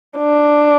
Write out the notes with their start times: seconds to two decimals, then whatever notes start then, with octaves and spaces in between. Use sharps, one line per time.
0.18 D4